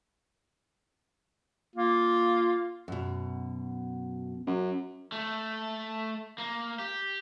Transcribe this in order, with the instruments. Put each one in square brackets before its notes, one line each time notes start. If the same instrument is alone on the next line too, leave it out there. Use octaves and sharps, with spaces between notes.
[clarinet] A#3 [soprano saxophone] F4
[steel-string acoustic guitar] F#2 B2
[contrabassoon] F#2
[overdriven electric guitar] A3
A#3
G4